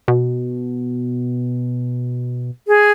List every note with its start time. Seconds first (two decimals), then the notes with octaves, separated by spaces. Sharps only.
0.08 B2
2.68 G#4